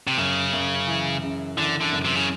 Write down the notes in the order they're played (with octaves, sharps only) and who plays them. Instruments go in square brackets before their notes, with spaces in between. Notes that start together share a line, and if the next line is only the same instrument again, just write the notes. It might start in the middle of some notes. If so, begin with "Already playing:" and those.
[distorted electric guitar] C3
[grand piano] F#2 [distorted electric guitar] C#3
[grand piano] F#2
E3
C#3
[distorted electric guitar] D3 [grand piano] E3
[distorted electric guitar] D3
[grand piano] F#2
[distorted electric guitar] C3
C#3